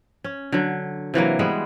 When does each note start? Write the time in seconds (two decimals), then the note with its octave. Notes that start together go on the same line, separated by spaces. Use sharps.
0.24 C#4
0.52 D3 F#3
1.14 C3 E3 F#3 A#3
1.39 G3 G#3 B3